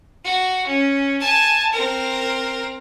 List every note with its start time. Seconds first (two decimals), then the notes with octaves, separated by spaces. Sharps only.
0.24 F#4
0.66 C#4
1.21 G#5 A5
1.73 C4 A#4